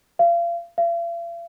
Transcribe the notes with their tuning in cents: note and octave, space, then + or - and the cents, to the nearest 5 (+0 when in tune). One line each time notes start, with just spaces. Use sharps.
F5 -35
F5 -45